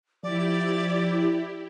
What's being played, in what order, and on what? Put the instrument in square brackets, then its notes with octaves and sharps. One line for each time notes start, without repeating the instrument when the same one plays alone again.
[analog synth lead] F3 [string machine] E4 G4 [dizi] D5